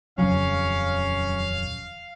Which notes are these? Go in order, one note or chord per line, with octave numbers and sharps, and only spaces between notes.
D#1 F2 C#3 F#3 C#4 F5